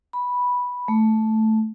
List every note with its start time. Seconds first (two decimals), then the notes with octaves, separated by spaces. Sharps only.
0.13 B5
0.88 A3